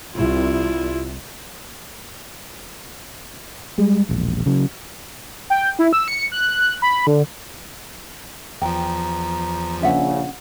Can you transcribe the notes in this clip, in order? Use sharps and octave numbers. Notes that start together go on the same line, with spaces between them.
C2 E4 F4
G3 G#3
E1 A#1
C#3 F#3
G5
E4
E6
C#7
F#6
B5
D3
E2 F3 G5 A#5
A#1 C#3 C#4 E5 F#5